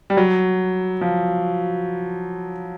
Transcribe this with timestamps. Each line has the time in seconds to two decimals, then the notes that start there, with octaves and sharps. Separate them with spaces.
0.10 G3
0.17 F#3
1.01 F3